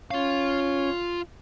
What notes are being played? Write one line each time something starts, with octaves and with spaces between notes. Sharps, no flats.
C#4 F4 C#5 F5